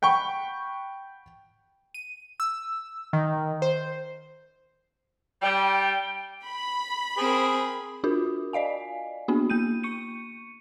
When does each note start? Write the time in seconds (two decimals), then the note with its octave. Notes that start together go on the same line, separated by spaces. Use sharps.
0.02 F#5 G5 B5 C#6
1.94 D#7
2.40 E6
3.13 D#3
3.62 C5
5.42 G3 G5
6.46 B5
7.18 C4 G#4 A#4
8.04 D4 F4 F#4 A#4
8.53 D5 D#5 F5 G#5
9.28 A#3 B3 D4 F#4
9.50 A#3 G6 D#7
9.83 C#6 C#7 D#7